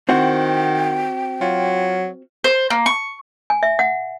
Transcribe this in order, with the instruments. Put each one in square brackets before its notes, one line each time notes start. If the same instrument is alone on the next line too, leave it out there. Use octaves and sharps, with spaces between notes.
[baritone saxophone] D#3 [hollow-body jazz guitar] C4 E4 F#4 [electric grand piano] C5 F#5 [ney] G5
[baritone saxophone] F#3 [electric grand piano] F4
[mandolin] C5
A#3
C#6
[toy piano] G#5
E5
F#5